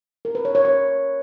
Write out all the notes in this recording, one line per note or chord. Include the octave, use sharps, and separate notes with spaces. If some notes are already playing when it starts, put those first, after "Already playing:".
A#4
B4
C#5
C#5
C#5